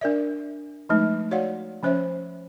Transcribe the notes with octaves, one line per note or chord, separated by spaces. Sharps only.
D4 A#4 D5 E5
F3 G#3 A3 D#4
F#4 C#5 D5 F5 F#5
F3 C#4 C5 C#5 E5